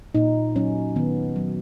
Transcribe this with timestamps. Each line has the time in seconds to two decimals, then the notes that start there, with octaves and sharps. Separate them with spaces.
0.15 A#2 D#4
0.55 F#3 C#4
0.96 D#3 B3
1.36 F#3